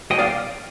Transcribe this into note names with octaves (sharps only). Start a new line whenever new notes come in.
G3 D#5 G5
D5 F5